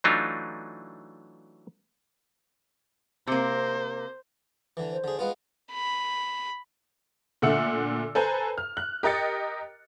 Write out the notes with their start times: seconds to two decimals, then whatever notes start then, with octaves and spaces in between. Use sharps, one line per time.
0.04 E3 F#3 A3 D4 D#4 F4
3.27 C3 A#3 C5
4.77 D3 E3
4.92 C5
5.04 D3 G#4
5.19 G#3 B3 F4 B4
5.71 B5
7.42 A#2 D3 A3 F#5 E6 C#7
8.15 A4 B4 C5 G#5 A#5
8.58 F6
8.77 F#6
9.03 G4 A#4 D#5 A6 C#7